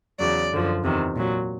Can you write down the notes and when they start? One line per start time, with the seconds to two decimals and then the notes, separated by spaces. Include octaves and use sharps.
0.20 E2 C#3 F#3 D5
0.52 F#2 D3 F3
0.83 E2 C3 D#3
1.16 A#2 F#3